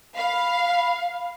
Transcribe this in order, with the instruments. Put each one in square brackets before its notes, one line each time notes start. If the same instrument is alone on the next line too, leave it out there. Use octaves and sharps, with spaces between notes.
[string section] F5 [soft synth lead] B5